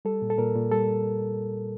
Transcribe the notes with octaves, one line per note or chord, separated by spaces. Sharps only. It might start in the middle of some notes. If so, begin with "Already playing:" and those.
G3 A4
A#2
A4
A#2 A#4
A#2
G3 A4